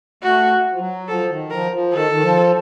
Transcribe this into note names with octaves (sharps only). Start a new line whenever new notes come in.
A3 F#4
F3
F#3
F3 A4
D#3
F3 A#4
F3
D#3 A4
D#3
F3